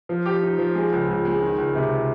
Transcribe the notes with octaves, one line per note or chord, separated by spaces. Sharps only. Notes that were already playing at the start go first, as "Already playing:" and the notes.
F3
G4
D#4
F3
G#3
C#2
C#2
G#3
D#3
C#2
C3